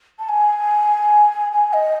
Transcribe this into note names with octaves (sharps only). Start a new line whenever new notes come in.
A5
G#5
G#5
D#5